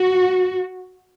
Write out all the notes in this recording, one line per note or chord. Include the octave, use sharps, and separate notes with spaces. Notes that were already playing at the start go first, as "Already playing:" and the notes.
Already playing: F#4